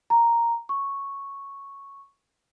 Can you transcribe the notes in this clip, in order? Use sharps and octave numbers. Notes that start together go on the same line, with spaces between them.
A#5
C#6